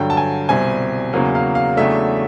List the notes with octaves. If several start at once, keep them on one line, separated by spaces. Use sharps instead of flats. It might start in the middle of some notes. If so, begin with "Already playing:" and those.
Already playing: G2 D3 F#3 G5
A5
G#5
C2 B2 G3 C4 G#5
E2 C#3 F#3 A#3
F5
F5
E2 C#3 F#3 A3 D4 E5